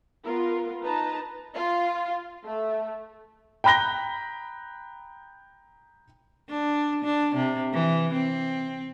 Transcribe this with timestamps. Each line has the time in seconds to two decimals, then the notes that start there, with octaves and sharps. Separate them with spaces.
0.25 B3 F4 A#4
0.83 D#4 B4 A5 A#5
1.55 F4
2.44 A3
3.64 G5 A#5 B5 F#6 A#6 G7
6.49 D4
7.04 D4
7.35 C3
7.73 E3
8.14 C4